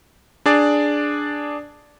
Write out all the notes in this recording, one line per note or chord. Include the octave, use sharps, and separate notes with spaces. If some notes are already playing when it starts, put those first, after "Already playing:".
D4 G#4 D5